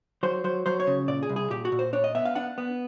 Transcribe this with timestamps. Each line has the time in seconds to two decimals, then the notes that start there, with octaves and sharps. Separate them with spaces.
0.23 F#3 C5
0.44 F#3 C5
0.66 F#3 C5
0.80 C#5
0.87 C#3
1.08 A#2 D5
1.23 G#4
1.29 C2
1.36 G#4
1.51 A#2 G4
1.65 F#4
1.72 A#2
1.79 C5
1.93 D4 C#5
2.04 D#5
2.15 B3 E5
2.25 F5
2.35 D4 F#5
2.58 B3